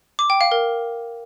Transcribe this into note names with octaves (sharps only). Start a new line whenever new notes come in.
D6
G5
F5
A#4